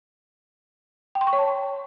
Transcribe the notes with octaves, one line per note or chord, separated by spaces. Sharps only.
G5
C6
C#6
C#5
A5